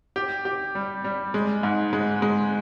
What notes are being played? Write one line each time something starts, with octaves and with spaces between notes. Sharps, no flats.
G4
G4
G3
G3
G#3
G#2
G#3
G#3